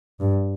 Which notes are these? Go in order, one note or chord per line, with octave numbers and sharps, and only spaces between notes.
G2